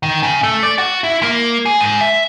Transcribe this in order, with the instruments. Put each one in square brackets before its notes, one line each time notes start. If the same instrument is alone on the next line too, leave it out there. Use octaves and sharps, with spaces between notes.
[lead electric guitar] D#3
C#3
A3
D5
F#4
E4
A#3
G#4
G#2
E5